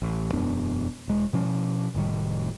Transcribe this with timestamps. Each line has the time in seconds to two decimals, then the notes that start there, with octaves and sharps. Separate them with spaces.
0.02 A1
0.33 E1 F#2 B3 D4
1.08 E1 G#3
1.33 B2 F3 C#4
1.94 F1 A2 D#3 G3